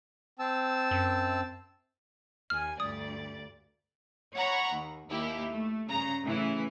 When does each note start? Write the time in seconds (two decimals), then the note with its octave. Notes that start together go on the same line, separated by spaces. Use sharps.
0.39 C4 A5 E6
0.91 F#2
2.50 D#2 G#5 F6
2.80 D2 G2 D5 D#6
4.34 C#5 F#5 A#5 B5 C#6
4.72 D#2
5.09 D#2 A#3 E4 G4
5.49 A3
5.89 G2 C#3 A#5
6.23 A2 C#3 E3 E4